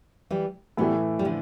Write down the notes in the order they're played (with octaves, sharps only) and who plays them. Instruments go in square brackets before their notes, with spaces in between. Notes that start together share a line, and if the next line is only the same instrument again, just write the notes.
[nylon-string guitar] E3 G3
[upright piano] A2 E3 A3 [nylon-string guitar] G3 B3
[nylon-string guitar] G3
D3 F3